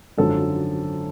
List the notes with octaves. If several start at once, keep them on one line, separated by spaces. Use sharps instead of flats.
G#1 F#2 D3 F3 A4